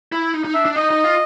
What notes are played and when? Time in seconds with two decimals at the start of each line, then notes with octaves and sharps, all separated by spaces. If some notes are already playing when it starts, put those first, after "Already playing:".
0.12 E4
0.34 D#4
0.45 D#4
0.54 D4 E5
0.65 D4
0.76 D#4 D#5
0.90 D#4
1.04 F4